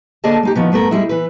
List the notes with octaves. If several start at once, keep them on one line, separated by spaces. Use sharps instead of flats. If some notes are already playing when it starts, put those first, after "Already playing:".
D3 A#3 G#4 D5 D#5 A5
G#3 D#4 G4
D#3 F3 B3
G2 A3 B3 A#4
G3 G#3 E4
E3 B4